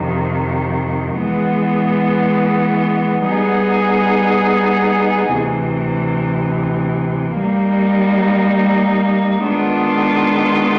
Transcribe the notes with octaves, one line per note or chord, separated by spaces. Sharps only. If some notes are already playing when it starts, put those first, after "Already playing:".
Already playing: F2 C3 D#3
E3 G#3 B3
G3 B3 D#4 G#4
D2 C3 E3
G3 A#3 D#4
D#3 G#3 B3 D4 F4